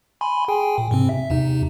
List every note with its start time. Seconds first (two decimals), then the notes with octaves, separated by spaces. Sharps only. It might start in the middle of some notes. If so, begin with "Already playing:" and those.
0.21 G#5 B5 C6
0.48 G#4 G5 G#5
0.78 A#2
0.91 G#2 C3 C4
1.09 E5
1.30 E2 C3 D#4